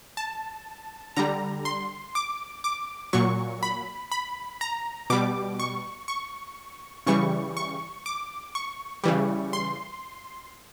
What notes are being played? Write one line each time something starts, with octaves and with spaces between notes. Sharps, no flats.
A5
D3 G3 A#5
C6
D6
D6
A#2 F#3 C#6
B5
B5
A#5
B2 G3 D6
C#6
C#6
C#3 E3 G3 C#6
C#6
D6
C#6
C#3 E3 G3
C6